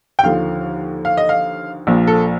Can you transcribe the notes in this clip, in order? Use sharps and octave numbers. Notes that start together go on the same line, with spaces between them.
G5
D#2 D3 F3 F5
F5
D#5
F5
A#1 A#2 F3
A4